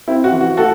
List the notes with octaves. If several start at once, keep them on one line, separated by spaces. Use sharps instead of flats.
C4 E4
F#4
E3
F#4
A3 F#4 A4